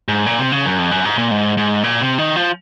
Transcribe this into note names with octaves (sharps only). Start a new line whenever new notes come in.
G#2
A#2
C3
C#3
F#2
F2
F#2
G#2
A#2
G#2
G#2
A#2
C3
D#3
F3